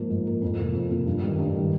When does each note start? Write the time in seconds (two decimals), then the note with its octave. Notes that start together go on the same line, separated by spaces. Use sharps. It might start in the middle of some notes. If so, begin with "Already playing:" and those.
Already playing: G#2 F3 A#3
0.10 G#2
0.26 F3 A#3
0.42 F2
0.58 C3 F3 A#3 F4
0.74 F2
0.91 C3 F3 A#3 F4
1.06 G2
1.22 D#3 G3
1.39 G2
1.54 D#3 G3